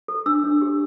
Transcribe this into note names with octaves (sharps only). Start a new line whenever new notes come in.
A4
D4 E6
D4
G4